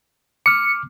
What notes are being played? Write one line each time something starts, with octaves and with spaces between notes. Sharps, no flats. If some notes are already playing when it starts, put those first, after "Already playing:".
D6 F6 C#7